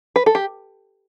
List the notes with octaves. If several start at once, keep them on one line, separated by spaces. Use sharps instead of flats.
B4
A4
G4